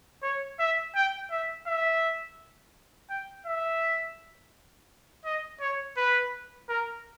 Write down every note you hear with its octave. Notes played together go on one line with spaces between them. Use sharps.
C#5
E5
G5
E5
E5
G5
E5
D#5
C#5
B4
A#4